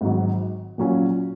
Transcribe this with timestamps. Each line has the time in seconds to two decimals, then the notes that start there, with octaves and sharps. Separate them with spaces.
0.01 G#1 G#2 F#3
0.78 A#2 F#3 C#4 F4